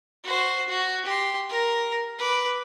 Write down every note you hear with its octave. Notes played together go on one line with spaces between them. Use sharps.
F#4 C5
F#4
G4 C6
A#4 A#5
B4 D6